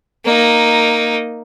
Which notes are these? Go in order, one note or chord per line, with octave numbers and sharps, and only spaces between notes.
A#3 D#4